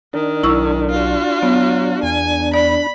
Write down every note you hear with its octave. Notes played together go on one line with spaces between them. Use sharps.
D#3 D4
B1 E4 C#6 E6
F4 F#4
F#3 B3
E2 G#5
D5 B5